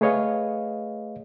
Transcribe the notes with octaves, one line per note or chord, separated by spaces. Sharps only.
A3 G#4 B4 C#5 D#5 F5